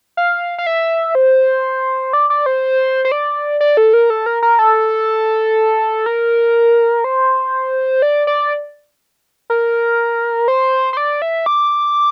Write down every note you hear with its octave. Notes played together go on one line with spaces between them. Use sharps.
F5
F5
E5
C5
D5
D5
C5
C5
D5
D5
A4
A#4
A4
A#4
A#4
A4
A#4
C5
D5
D5
A#4
C5
C5
D5
E5
D6